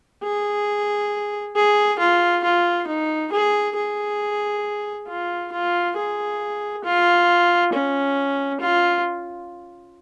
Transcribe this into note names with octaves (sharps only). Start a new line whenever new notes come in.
G#4
G#4
F4
F4
D#4
G#4
G#4
F4
F4
G#4
F4
C#4
F4